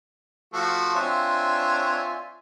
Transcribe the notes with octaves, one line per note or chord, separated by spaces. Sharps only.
F3 A3 F#4
C4 D4 F4 C#5 E5 G#5